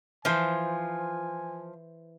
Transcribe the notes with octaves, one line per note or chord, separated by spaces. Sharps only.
E3 F3 C5 G#5